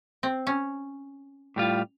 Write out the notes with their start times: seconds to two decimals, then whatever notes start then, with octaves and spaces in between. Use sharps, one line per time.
0.23 C4
0.47 C#4
1.56 A2 G3 F4